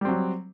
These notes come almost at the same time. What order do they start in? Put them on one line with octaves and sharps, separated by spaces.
G3 C4 F#3